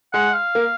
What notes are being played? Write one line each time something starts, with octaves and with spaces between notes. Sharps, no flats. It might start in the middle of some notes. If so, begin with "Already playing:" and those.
G#3 F#5
F5
A#3